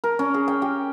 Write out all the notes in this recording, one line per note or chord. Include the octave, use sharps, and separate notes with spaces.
A#4
C#4
G#4
G5
G4